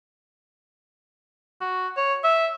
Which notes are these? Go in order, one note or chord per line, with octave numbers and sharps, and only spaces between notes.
F#4
C#5
E5